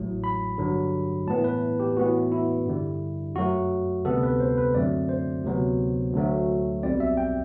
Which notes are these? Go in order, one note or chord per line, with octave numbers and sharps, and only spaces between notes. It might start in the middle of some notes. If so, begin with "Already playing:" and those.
Already playing: A1 A2 F#3
B5
G2 D3 F#3
A2 E3 B3 A5
B4
G4
A2 E3 B3 F#4
E4
G2 D3 G3
F#2 F#3 A3 F#4
D2 C3 G3 B3 A4
B4
C5
B4
F#2 D3 F#3 A3 C4 D5
C5
D2 C3 F#3 B3
D2 D3 F#3 A3
B1 B2 G3 C4 D5
E5
G5